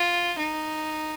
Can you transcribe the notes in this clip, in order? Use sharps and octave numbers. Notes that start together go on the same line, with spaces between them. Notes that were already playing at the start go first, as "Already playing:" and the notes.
Already playing: F4
D#4